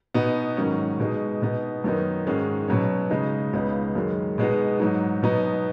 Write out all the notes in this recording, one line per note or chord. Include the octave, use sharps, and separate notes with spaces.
B2 B3 D#4
G#2 D#3 F#3 C#4
B2 G#3 D#4
B2 B3 D#4
F#2 D#3 B3 D#4
G#2 D#3 G#3 C#4
B2 F#3 C#4
C#3 G#3 D#4
C#2 C#3 B3 D#4
F#2 D#3 G#3
B2 G#3 B3 D#4
G#2 F#3 D#4
B2 F#3 B3 D#4